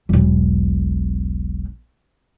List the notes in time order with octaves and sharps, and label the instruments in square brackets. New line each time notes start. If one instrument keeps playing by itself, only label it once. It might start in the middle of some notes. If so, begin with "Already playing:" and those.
[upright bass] E1 B1